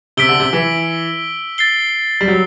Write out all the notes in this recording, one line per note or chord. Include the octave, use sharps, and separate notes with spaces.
C3 E6 B6 D7 G7
D3
C3
E3
A6 C7 G7
G3
F#3